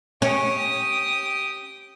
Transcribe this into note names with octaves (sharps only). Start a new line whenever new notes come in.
C#4 G4 D#6